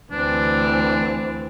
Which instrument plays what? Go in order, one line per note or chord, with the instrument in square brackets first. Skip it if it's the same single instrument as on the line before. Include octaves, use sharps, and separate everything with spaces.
[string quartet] D2 E3 C4 [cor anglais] D4